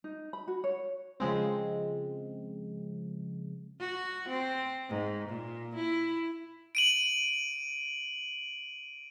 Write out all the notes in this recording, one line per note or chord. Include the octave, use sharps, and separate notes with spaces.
D#4
B5
F#4
C#5
C#3 F3 G#3 C4
F#4
C4
G#2
A#2
E4
D7 D#7 F#7